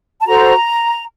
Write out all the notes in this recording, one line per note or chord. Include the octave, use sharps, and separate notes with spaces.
A5
F#4 A4 C5 A#5